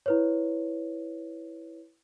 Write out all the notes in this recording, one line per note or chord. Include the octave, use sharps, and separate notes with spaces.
E4 B4 C#5